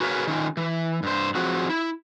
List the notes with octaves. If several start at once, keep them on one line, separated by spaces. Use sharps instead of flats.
F#4 G#4 A#4 B4 C#5 F5
D#3 C#4 F4
E3
G2 C5
F3 F#3 C4 F#4 G#4
E4